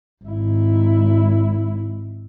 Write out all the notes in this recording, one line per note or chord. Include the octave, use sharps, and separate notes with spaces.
G#1 E4